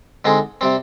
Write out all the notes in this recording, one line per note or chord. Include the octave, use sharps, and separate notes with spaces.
D3 G#3 C4 D#4 G#4
C3 G3 C4